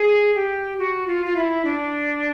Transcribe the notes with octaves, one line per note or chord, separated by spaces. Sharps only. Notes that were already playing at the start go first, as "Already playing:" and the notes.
Already playing: G#4
G4
F#4
F4
F4
E4
D4